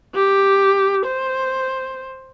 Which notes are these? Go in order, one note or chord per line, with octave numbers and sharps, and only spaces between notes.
G4
C5